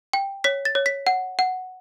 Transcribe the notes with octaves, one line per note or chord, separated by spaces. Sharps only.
G5
C#5 B6
A6
C#5
B6
F#5
F#5